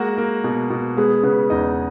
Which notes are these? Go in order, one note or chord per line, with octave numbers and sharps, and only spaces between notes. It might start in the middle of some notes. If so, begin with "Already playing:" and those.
Already playing: G#3 A#3 F#4 F#5
A#3
B2
B2
G#3 B3 G#4
C#3 B3 B4
E2 D#4 D#5